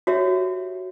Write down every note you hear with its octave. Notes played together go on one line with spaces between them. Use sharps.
F#4 G4 C#5 E5